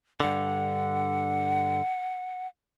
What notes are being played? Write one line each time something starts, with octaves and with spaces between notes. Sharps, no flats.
G2 D3 F#5